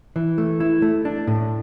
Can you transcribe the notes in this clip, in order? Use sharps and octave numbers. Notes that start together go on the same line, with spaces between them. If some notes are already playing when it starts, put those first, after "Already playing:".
E3
A3
E4
A3
D4
A2